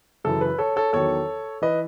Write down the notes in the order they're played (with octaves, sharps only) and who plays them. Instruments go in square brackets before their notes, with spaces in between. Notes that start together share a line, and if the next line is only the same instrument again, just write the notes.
[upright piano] F#2 C#3 E3 A4
B4
A4 C#5
A4 C#5
E2 D#3 F#3 A4 C#5
E3 B4 D#5